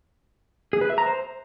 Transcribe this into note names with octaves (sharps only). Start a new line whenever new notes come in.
G#4
B4
E5
A#5
C5